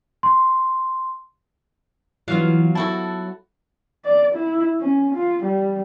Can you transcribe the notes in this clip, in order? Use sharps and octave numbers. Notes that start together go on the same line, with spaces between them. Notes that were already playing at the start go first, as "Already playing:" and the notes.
C6
E3 F#3 B3 F4 F5
E4 F#4 A4 A5
D5
E4
C#4
F4
G3